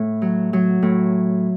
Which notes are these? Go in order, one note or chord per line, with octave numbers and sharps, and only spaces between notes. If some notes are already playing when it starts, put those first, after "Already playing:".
Already playing: A2
F#3
F#3
A2